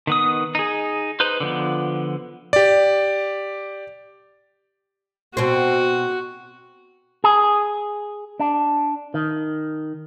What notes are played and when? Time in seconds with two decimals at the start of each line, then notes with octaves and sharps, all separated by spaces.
0.07 D#3 B3 D#6
0.55 D#4 G#4
1.20 D#4 B4 C5
1.40 D3 F3 B3
2.53 G4 D5
5.37 B2 C4 F#4
7.24 G#4
8.40 D4
9.14 D#3